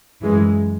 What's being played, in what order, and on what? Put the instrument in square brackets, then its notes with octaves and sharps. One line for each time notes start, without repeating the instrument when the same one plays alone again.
[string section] F#2 E3 G#3